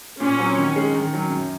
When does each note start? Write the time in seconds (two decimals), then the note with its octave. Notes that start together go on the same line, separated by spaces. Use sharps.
0.20 A#2 C#4
0.38 F#3 C4 F#4
0.58 D#3
0.76 G#3 C#4
0.95 D#3
1.13 F#3 C#4
1.30 F#2